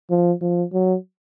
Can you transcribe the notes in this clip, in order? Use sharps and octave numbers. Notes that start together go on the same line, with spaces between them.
F3
F3
F#3